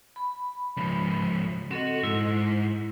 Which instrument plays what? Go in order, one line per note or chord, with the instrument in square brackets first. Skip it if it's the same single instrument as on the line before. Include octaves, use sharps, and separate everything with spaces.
[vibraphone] B5
[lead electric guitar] C#2 F3
[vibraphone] C4 A4 D#5 [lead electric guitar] F#4
[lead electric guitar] G#2 [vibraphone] E4